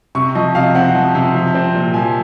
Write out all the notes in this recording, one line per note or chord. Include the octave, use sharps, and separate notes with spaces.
C3 C#6
F3 D#5
C3 F5
C4 F#5
F3
C3
F3
C4
A#2
F3 G#5